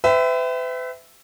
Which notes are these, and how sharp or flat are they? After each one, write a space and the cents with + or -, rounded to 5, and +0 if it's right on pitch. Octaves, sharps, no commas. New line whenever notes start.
B4 +45 E5 +0 G5 +0